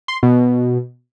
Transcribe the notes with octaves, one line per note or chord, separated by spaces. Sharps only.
C6
B2